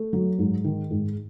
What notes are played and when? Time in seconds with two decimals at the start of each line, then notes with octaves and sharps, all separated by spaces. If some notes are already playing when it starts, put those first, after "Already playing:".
Already playing: A3
0.13 F#3
0.39 G#2
0.64 D#3
0.91 G#2